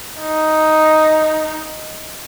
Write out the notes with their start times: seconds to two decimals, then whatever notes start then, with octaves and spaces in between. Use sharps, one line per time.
0.20 D#4